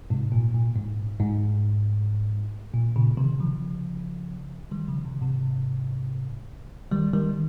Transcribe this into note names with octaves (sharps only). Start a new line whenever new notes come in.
G#2 C3
A#2
A#2
G#2
G#2
A#2
A#2 C#3
C3 D#3
C#3 F3
D#3 G3
C#3 F3
C3 D#3
G#2 C3
D#3 G3
D#3 G3